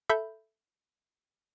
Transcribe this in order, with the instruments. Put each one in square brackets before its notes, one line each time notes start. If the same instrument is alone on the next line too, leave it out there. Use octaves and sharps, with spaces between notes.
[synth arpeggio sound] A4 E5 B5 G6